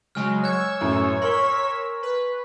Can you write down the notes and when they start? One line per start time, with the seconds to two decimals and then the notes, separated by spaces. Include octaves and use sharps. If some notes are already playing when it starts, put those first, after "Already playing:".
0.15 C#3 F#3 G#3 G#5 F6
0.44 C#5 C#6 E6 F#6 G#6
0.81 F#2 A2
1.22 A#4 C6 C#6 E6 B6
2.02 B4